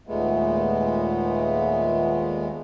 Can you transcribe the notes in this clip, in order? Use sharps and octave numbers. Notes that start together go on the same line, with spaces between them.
D#2 A#2 G#3 A3 B3